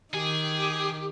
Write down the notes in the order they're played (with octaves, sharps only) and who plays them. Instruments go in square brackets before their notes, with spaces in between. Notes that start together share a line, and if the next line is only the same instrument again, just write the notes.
[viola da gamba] D#3 [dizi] G4 [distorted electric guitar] G#4